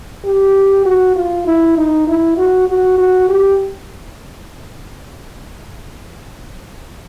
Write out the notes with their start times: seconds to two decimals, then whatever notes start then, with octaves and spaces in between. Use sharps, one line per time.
0.25 G4
0.86 F#4
1.16 F4
1.47 E4
1.77 D#4
2.08 E4
2.37 F#4
2.68 F#4
2.98 F#4
3.29 G4